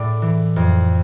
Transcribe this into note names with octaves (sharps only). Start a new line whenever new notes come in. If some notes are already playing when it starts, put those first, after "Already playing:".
Already playing: A2 D5 E5
E3
F2